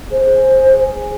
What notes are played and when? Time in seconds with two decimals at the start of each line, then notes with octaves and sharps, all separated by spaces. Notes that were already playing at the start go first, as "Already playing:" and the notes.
0.11 G#4 C5